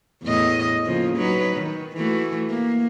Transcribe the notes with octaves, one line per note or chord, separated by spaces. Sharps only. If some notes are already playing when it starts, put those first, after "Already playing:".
E2 A2 D#5
C#3 F3 A#3
F#3 D#4 B4
D#3
E3 A3 F#4
A#3